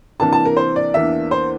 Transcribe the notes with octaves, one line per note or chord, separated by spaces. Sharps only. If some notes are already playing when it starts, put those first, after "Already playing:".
C3 E3 A#3 D4 A5
A5
A#4
C5
D5
E2 E3 A#3 D4 E5
C5